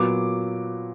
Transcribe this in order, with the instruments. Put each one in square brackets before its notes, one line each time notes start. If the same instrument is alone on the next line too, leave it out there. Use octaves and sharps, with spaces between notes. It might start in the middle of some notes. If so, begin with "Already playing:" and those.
Already playing: [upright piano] A#2 F#3 B3 D6